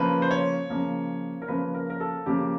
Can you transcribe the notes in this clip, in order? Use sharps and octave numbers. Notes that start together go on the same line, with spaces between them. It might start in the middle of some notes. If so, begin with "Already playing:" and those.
Already playing: C#3 F3 A#3 B4
C5
C#5
C#3 F3 A#3
A#4
C#3 F3 A#3 B4
A#4
A#4
A4
C#3 F3 A#3 G4